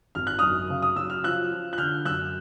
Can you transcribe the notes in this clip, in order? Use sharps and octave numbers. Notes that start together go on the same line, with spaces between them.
G#1 F6
F#6
F#2 D#6 F6
C#3
D#6
F#3 E6
F6
F3 E6 F#6
F3
F#6
D3 F6 G6
F#2 E6 F#6